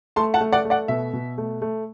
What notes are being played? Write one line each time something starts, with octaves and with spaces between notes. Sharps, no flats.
A3 A5 C6
F#5 A5
A3
D5 F#5
A3
D5 F#5
B2 E5
B2
A3
A3